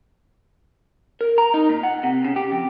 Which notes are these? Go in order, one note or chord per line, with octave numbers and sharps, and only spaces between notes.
A#4
A#5
D#4
A#2
F#5
C3
C#3
G4
F2